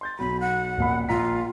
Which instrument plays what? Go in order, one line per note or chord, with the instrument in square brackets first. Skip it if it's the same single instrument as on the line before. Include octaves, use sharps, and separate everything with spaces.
[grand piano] C6 G6 A6
[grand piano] B1 F#3 [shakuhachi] B5
[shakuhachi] F#5
[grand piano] D#1 A#1 B5
[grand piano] A#1 A#5 B6 [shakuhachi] F4